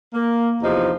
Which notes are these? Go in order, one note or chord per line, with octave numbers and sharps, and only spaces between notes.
A#3
E2 C3 F3 D#4